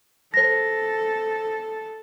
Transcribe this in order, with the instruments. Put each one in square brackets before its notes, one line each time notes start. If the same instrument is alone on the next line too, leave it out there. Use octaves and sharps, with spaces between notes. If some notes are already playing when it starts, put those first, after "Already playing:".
[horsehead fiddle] A4 [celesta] C5 A#6